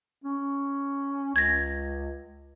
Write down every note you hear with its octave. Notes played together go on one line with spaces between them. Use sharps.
C#4
C#2 G#6 A#6